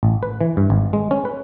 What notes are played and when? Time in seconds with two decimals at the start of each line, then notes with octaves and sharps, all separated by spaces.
0.03 A1
0.23 B4
0.41 E3
0.57 G2
0.70 G#1
0.93 G#3
1.11 C#4
1.25 B4